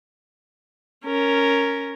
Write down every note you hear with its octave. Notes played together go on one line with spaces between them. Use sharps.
C#4 A#4